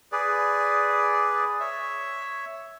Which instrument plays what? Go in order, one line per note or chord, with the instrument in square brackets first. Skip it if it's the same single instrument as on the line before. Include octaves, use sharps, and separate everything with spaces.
[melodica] G#4 B4 D5
C#5 E5